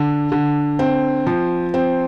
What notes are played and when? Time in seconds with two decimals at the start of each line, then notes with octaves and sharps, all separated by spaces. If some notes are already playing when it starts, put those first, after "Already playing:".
Already playing: D3
0.32 D3
0.79 C4
1.27 F3
1.74 C4